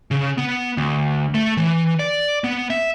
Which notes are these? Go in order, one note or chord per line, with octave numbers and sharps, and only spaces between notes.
C#3
B3
D2
A3
E3
D5
B3
E5